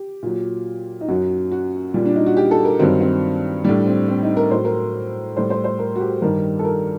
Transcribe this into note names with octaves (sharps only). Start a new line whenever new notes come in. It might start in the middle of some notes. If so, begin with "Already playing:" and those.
Already playing: G4
A#2 F#3
D#4
F#2 F#3 F#4
F#4
A#2 G3
D4
D#4
F#4
G4
A4
A#4
G2 D#3 F#3 C4
C4
A2 G3 D4
C4
C4
D#4
A#4
A2 F#3 C5
A#4
A2 G3 C5
C5
C5
A#4
F#4
G4
G2 D#3 G3 A#4
A4
A#4